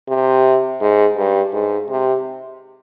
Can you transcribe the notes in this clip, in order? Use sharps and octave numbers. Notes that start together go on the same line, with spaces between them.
C3
G#2
G2
G#2
C3